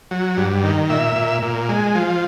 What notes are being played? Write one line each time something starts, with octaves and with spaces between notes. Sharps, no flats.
F#3
G2
D#3
A#2 E5
A#2
A#2
G#3
F3